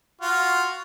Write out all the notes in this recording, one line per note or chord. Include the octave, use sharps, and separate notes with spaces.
F4 F#4